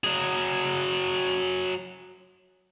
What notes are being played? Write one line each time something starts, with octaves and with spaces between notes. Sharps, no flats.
F#3 G#4